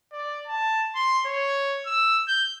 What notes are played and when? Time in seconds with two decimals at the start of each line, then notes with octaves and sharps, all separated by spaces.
0.12 D5
0.47 A5
0.95 C6
1.26 C#5
1.86 E6
2.28 G6